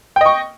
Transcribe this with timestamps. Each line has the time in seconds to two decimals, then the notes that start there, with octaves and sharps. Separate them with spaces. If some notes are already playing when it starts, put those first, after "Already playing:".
0.16 G5
0.21 D#5
0.26 C#6